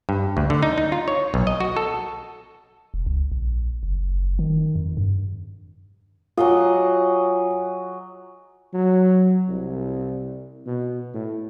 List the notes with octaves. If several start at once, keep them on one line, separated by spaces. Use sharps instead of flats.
G2
D2
D3
D#4
D#4
F4
C#5
B1
D#5
F#4
A4
E1
C#2
A#1
F#1
D#3
F2
G2
F#3 F4 G#4 D#5
F#3
C2
B2
A2